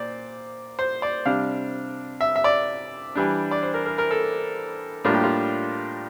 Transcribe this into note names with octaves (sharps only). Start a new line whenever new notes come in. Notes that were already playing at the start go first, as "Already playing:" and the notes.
Already playing: A#2 C5 D5
C5
D5
C3 G3 D4 F5
E5
E5
D5
E3 G3 D4
D5
C5
A#4
A#4
A#4
A4
A2 G3 A#3 D4 F4
G4
F4